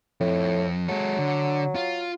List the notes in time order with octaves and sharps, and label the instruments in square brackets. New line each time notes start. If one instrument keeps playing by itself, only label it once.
[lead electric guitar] F2 [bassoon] A2
[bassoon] F#3 [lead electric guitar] G#3 A4
[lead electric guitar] D3
F4